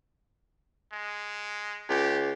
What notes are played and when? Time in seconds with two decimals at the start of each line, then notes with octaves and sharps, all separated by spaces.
0.93 G#3
1.90 C#2 G4